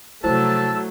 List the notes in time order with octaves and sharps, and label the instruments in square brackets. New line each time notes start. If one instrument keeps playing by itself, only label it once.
[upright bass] C3 F3 [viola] F#3 A3 [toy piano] E4 C5 [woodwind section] A5 E6